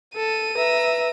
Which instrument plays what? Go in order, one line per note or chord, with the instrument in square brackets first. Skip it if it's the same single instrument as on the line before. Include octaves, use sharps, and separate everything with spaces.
[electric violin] A4 [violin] D#7
[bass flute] B4 [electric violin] E5 A#5